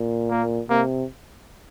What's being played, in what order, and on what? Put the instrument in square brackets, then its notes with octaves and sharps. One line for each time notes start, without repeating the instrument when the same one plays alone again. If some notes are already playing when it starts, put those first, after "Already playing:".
Already playing: [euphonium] A#2
[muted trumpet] A#3
[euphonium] C3 [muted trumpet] A#3